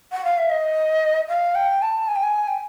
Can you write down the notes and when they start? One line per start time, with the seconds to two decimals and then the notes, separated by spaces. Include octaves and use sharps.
0.12 F#5
0.25 F5
0.38 E5
0.50 D#5
1.29 F5
1.55 G5
1.82 A5
2.08 G#5
2.16 G5
2.23 G#5
2.48 G5